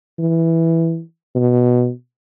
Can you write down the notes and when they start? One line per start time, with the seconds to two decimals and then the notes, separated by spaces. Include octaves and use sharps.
0.19 E3
1.35 B2